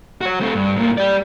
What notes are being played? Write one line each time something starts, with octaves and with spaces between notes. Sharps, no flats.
F#4 C#5
A3 C4
G2
A2 A#3
G4 D5